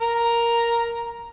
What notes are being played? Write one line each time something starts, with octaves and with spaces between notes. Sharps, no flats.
A#4 A#5